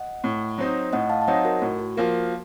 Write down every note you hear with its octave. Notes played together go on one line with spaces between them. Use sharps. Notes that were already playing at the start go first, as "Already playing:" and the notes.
Already playing: D#5 F#5
A2
F#3 C4 D#4
A2 D#5 F#5
F5 A5
A5
F#3 C4 D#4 D#5 F#5
F#4 A#4
A2 F#4
F#4
F3 A#3 F#4 A#4